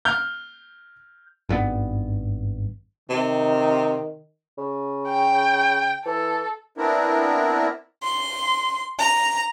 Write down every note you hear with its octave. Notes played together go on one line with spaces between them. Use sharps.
F6 G6
G#1 G2 D#3 B3
C3 D#3
C#3
G5
E3 A4
B3 C4 D4 E4 A#4
C6
A#5